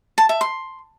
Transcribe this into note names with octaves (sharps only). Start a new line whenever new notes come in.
A5
E5
C6